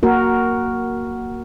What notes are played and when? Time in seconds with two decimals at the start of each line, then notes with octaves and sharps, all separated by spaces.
0.03 A#3 F#4 A#4